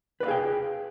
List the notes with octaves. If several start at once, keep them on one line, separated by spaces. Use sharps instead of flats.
G#4 B4 D5 F5 G5